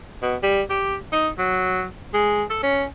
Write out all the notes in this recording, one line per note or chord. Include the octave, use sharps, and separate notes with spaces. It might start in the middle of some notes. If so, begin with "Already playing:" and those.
B2
G3
G4
D#4
F#3
G#3
A4
C#4